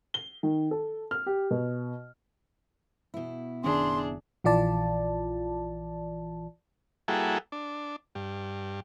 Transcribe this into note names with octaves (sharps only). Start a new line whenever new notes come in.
G7
D#3
A4
F6
G4
B2
B2 E4
F#1 D#3 C#4 D4 G#4 C6
A#1 E3 F4 D5 A5
G3 A#3 E4 F#4 G#4 A4
D4
G2